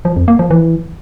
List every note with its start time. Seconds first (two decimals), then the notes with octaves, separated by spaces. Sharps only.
0.05 F3
0.16 F2
0.28 A#3
0.39 F3
0.51 E3